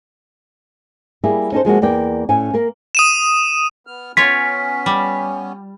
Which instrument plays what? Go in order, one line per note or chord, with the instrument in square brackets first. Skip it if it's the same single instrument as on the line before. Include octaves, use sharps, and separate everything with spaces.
[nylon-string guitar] G3 A#3 E4 G#4
C#4 D#4 A4 C5
F3 G#3 A#3 F#4
E2 A#3 D5 G5
A2 C#4 G#5
A#3 A#4
[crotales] D#6 D#7 E7
[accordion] B3 F6
[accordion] B3 C#4 [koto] F4 C#5 [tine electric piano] B6
[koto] G3